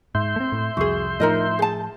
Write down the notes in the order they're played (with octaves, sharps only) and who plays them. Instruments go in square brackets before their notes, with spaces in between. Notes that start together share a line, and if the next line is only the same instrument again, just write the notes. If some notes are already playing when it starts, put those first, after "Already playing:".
[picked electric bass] G#2 [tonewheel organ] E5 C6 G6
[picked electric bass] A3 C4
A2
[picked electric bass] C2 F2 [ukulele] F#4 G#4
[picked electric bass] A2 F3 [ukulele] D#4 A#4 D#5
[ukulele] G#4 A5